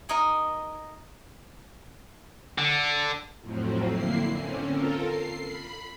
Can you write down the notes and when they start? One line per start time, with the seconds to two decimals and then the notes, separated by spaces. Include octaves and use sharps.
0.09 D#4 A#4 D#5 G#5
2.58 D3
3.41 F2 A2 F3 F#3 C4
3.89 D3 A#3 E4 C7
4.31 D3 C4 C#4
4.66 F4 A4 A#4
5.02 C7
5.42 B5